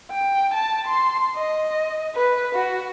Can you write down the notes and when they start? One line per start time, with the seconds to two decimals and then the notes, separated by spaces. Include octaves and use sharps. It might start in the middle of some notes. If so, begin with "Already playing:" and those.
0.11 G5
0.54 A5
0.87 C6
1.37 D#5
2.15 B4
2.55 F#4